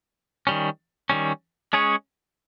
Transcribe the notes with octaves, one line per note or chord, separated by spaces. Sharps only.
D#3 G3 C#4
D#3 G3 C#4
G#3 C#4 G#4 C#5